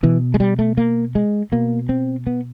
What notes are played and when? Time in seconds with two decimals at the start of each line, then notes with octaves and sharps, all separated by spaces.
0.03 B2 E3
0.34 G#3
0.40 G3
0.59 A3
0.77 A#3
1.15 G#3
1.52 B2 A#3
1.89 C4
2.27 B3